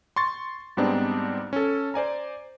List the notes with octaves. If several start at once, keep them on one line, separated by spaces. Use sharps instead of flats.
C6 C#6 A6
G#2 G3 B3 C4 D4 D#4
C#4 A4
C5 D5 G#5 A#5